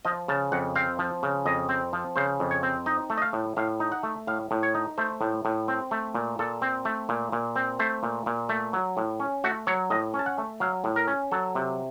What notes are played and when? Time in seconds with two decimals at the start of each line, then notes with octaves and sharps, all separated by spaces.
0.05 F3 D#5
0.28 C#3 A5
0.52 F2 F#5
0.75 C4 F5
0.99 F3
1.23 C#3
1.46 F2 D#5
1.69 C4
1.93 F3
2.16 C#3 C5
2.40 F2
2.51 C#5
2.63 C4
2.86 D#4 D#5
3.10 A3
3.17 D#5
3.22 F5
3.33 A2
3.57 A2 F5
3.80 D#4
3.92 F#5
4.03 A3
4.27 A2 F5
4.51 A2
4.63 C#5
4.75 D#4
4.98 A3 C5
5.21 A2
5.45 A2
5.68 C4
5.91 A3
6.14 A#2
6.39 A#2 A4
6.62 C4
6.85 A3
7.09 A#2
7.32 A#2
7.56 C4
7.79 A3 C5
8.03 A#2
8.26 A#2
8.49 A3
8.73 F#3
8.97 A2
9.20 C#4
9.44 A3 F#4
9.67 F#3 C#5
9.90 A2 D#5
10.14 C#4
10.19 A5
10.26 F#5
10.38 A3
10.60 F#3 F5
10.84 A2
10.96 A#4
11.07 C#4
11.32 F#3 A4
11.55 C3